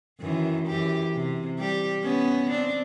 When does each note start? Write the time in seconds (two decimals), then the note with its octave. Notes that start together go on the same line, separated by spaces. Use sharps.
0.20 F#2 D#3 E3
0.67 F#2 E3 G4
1.14 C3
1.59 G3 G4
2.03 B3 C#4
2.50 C4 D4